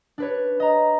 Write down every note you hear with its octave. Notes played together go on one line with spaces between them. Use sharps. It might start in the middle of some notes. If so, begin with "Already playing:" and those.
D4 B4 C#5
D#5 A#5